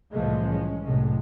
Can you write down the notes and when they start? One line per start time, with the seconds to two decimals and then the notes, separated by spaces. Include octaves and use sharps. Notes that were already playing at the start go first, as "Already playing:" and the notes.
0.13 C2 A2 E3 F3 G#3 A3
0.44 G#3 C#4
0.84 C2 A2 C3 F#3 G#3